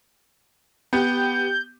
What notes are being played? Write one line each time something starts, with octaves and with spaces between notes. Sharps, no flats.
B3 G4 G6